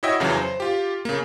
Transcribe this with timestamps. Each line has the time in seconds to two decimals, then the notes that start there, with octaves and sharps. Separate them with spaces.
0.03 E4 F#4 C#5 D#5 E5 G5
0.20 F2 C#3 E3 F#3
0.37 C5
0.60 F4 G4
1.05 C#3 A#3